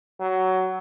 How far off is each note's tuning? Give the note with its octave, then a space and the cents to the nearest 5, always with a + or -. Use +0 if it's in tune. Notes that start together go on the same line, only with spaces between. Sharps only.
F#3 +15